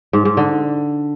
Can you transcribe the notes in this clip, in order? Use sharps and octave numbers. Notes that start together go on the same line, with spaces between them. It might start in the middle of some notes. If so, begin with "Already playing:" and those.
G#2
G#2
D3